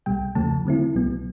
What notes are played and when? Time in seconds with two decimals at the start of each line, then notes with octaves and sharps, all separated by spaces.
0.06 C2 B2 G3 G5
0.35 E2 C#3 F3 A3 A5
0.65 D3 F#3 A3 C4 E4
0.95 C2 B2 F#3 B3